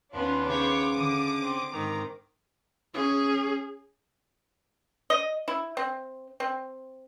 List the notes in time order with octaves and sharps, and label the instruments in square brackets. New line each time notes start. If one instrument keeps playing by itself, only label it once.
[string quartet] D#2 B3 [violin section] C#4 D4 F4
[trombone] C#3 [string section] C5 C#5 [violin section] D6
[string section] D3 D#6
[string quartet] C4
[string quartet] G#2 D#3 C4 [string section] A#5
[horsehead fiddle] C#4 G#4
[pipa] D#5
E4
C4
C4